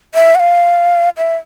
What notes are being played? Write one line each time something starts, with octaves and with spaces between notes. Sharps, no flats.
E5
F#5
F5
E5